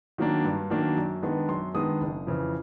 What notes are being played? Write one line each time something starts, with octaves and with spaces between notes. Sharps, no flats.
D#3 F#3 A#3 D4
G2
D#3 F#3 A#3 D4
F#2
D#3 G#3 B3 D4
F#2 C6
D#3 G#3 B3 D4 D#6
F#1
F2 C#3 E3